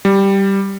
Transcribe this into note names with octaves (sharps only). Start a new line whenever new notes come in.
G3